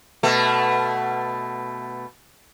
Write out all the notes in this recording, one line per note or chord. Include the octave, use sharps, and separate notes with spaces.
B2 A3